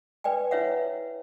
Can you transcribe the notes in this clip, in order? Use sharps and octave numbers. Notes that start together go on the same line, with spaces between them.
B4 D5 G5 G#5
E4 B4 C#5 E5 F#5